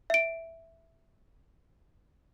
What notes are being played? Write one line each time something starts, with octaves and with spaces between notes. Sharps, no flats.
E5 D7